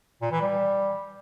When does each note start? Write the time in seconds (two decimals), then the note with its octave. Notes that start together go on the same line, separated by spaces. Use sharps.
0.21 A#2
0.31 E3
0.41 G3